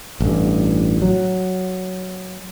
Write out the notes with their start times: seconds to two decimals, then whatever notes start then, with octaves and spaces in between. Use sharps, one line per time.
0.20 A1 G2
1.02 F#3